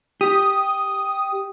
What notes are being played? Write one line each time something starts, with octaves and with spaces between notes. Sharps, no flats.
G4 D#6